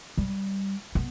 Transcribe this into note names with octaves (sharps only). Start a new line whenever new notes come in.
G3
B3